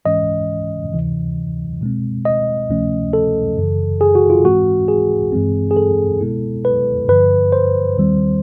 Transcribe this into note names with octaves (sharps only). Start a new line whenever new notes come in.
G#2 E3 G#3 C#4 D#5
D2 C3 E3
B2 G#3 C4
D#5
D2 C3 F3 A3 C#4
A4
F#2 C#3 E3
G#4
F#4
F4
G#2 E3 G#3 C4 F#4
G#4
G2 E3 G#3 C4
G#4
A4
B2 G#3 B3 E4
B4
G2 D3 F3 B4
C5
D#2 D#3 G3 C4